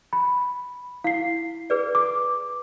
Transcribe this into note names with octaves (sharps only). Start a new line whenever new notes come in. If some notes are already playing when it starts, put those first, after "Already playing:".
B5
E4 F5 C7
G#4 B4 D5
D6